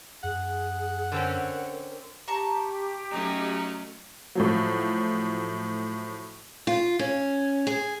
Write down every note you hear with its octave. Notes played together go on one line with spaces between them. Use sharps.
F#2 G#4 F#5
D3 C4 C#4 A#4
G4 A5 A#5 C#6
F#3 A3 C#4 D#4
A2 F3 F#3
F4
C#4
G#4